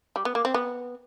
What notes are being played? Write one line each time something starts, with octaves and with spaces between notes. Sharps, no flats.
G3
B3
A#3
C4
B3